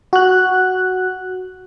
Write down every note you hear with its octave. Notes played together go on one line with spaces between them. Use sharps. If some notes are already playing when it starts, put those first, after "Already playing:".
F#4 F#6